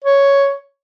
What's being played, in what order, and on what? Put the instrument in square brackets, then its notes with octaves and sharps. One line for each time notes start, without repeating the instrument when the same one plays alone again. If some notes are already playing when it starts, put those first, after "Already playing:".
[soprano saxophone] C#5